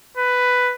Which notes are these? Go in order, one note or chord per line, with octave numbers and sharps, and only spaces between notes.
B4